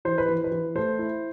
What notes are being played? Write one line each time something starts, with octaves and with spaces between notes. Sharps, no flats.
E3 C5
B4
E3
B4
E3
A3 C5
E4